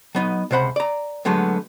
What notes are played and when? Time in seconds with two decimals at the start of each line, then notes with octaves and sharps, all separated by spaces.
0.15 F#3 B3 D#4
0.51 C#2 C3 C5 F#5 B5
0.76 D5 A#5
1.25 D3 F#3 G#3 A3 B3